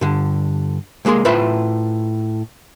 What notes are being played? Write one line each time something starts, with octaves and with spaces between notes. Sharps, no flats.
G2 D3
C2 G#3 A#3 G#4 C6
A2 F4 B4 C5 E5 B5